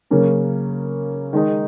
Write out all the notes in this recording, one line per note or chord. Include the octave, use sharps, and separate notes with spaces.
C#3 F#3 A#3 C#4 A#4
D#3 G#3 D#4